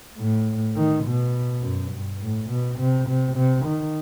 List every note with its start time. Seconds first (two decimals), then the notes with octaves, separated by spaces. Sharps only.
0.17 A2
0.76 D#3
1.05 B2
1.62 F#2
1.92 G2
2.21 A2
2.50 B2
2.79 C3
3.08 C3
3.36 C3
3.65 D#3